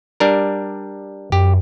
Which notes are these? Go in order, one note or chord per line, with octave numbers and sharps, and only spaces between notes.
G3 D4 A#4
F#2 G4